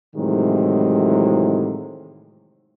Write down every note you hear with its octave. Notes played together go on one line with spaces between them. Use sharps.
A2 C3 D#3 E3 F#3 G#3